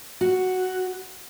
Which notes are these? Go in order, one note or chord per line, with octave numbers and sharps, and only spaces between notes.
F#4